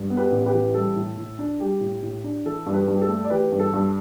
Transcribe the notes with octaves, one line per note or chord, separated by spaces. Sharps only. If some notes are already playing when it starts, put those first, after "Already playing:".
Already playing: G2
B3
G4 B4
A1
G4 B4
E3
G3 A4
A2
A2
D4
G3 G4
A2
A2
D4
E3 A4
G2
G4 B4
G2
G4
A4
A3
D5
E3 G4 B4
G2
A4
G2